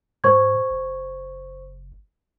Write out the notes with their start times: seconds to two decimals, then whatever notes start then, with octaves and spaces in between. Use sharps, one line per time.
0.24 G#2 C5 C#6 G#6
0.70 F#1